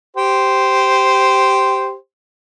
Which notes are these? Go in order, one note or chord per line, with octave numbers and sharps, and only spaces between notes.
G4 C5